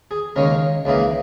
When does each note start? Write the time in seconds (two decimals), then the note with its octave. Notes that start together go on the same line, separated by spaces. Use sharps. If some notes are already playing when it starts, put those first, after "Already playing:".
0.11 G#4
0.36 D#2 C#3 G#3 C#4 A#4
0.85 C#2 C#3 E3 A#3 D#4